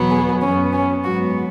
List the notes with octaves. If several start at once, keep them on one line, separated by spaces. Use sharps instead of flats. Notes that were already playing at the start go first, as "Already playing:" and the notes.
Already playing: E2 B2 F#3 B3
G#4
F#2 F#3 B3 C#4
C#4
G#2 F#3 B3 F#4